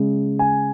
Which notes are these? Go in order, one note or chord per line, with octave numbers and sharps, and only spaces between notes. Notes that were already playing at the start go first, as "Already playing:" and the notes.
Already playing: C#3 G#3
G#5